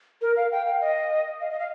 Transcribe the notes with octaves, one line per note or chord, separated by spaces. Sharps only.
A#4
F5
G5
F5
D#5
F5
D#5
F5